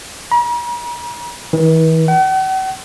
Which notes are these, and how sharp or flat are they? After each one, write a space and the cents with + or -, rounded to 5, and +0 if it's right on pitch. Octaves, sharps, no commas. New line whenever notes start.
A#5 +45
E3 -40
F#5 +45